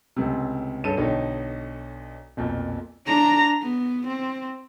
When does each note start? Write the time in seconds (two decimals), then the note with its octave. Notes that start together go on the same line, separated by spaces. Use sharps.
0.16 C#2 A2 C3
0.84 G2 C#4 A4 D#7
0.97 B1 D3 D#4 C#5 G5
2.37 B1 F2 A#2
3.06 D4 A#5
3.62 B3
4.07 C4